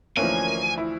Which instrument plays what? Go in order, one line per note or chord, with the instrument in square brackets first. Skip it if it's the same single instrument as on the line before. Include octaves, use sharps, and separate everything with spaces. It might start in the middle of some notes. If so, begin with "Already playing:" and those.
[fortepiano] D2 E3 F3 [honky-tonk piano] A#3 C#4 [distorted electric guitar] G#5
[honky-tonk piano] E4